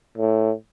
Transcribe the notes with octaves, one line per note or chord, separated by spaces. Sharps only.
A2